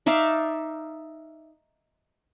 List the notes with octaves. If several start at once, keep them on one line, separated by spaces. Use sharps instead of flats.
D#4 D5 E5 F5